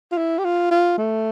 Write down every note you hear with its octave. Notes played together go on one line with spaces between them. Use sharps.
F4
E4
G4
F4
F4
A3